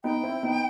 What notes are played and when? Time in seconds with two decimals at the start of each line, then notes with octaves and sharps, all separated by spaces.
0.04 B3 D#4 G5
0.23 C4 E4
0.43 B3 D#4